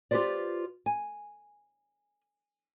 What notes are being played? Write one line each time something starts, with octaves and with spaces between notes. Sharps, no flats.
F4 G4 G#4 B4 C5 D5
G#5